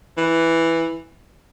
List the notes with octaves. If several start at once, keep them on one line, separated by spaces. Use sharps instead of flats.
E3